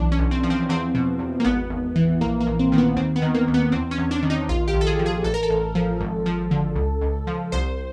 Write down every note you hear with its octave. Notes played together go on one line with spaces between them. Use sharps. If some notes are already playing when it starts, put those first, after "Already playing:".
Already playing: B1 E3 D4
C#4
B1
C4
F3
C4
E2 C4
B2
E2
A#3
G#1 B3
G#1
E3
A#1 A#3
A#3
A#1
C4
D#3 C4
B3
D#2 C4
B3
D#3
A#3
D#2
B3
E2 C4
C#4
E2
D4
D#3
D#4
A#1 F4
G4
A#1
A4
G#4
F3
G#4
A1 A4
A#4
A4
A1
F3
G#1
F3
D3
C#2
C#2
F3
C2 C5